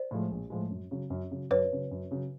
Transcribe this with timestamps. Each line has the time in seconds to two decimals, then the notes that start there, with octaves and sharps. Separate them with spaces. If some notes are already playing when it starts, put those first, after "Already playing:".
Already playing: C5 D5
0.11 A2 F3 G#3
0.31 A#1
0.50 A2 F3 G#3
0.70 F#2
0.91 C#3 F#3
1.10 F#2
1.31 C#3 F#3
1.50 F#2 B4 C#5
1.71 C#3 F#3
1.91 F#2
2.11 C#3 F#3